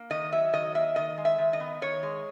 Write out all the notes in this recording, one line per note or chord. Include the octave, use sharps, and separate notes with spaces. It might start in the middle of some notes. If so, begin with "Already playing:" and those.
Already playing: A#3
D#3 D#5
F#3 E5
D#3 D#5
A#3 E5
D#3 D#5
G#3
E5
D#3
D#5
B3
D#3 C#5
G#3